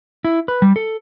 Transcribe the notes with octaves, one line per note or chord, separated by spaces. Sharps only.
E4
B4
G3
A4